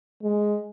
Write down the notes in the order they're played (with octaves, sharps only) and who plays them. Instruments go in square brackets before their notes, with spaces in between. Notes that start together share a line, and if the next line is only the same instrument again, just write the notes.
[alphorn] G#3